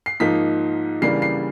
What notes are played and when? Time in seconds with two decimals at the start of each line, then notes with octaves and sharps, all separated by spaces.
0.06 C7
0.20 G#2 F3 A#3 D#4 B6
1.02 C#3 E3 G3 A#3 D4 C7
1.22 C7